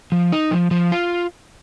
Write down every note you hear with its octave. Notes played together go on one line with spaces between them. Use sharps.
F3
D#4
F3
F3
F4